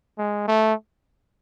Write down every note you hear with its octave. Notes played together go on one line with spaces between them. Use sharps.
G#3
A3